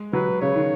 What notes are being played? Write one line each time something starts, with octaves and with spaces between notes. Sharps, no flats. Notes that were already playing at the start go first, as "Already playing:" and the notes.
Already playing: G#3
F#3 B4
C#3 C#5
D#3